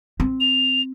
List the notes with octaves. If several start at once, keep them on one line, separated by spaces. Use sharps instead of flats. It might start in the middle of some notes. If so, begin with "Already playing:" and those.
C4
F7